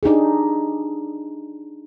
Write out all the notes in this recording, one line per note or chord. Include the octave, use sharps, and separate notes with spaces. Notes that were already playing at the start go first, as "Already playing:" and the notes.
D4 D#4 G4 G#4